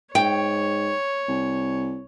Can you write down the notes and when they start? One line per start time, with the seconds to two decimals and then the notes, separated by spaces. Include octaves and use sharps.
0.15 G#2 C#5 G5
1.28 C2